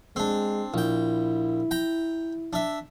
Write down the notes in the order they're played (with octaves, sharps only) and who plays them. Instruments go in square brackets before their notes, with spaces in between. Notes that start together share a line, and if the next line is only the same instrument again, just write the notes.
[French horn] G#3 [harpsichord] C4 D4
[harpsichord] A#1 G5 [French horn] E4
[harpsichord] G5 A#5
D4 E5